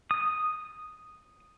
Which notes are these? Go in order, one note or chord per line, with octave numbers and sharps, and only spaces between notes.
D#6